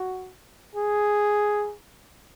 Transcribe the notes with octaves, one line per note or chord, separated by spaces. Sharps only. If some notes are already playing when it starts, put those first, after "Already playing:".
Already playing: F#4
G#4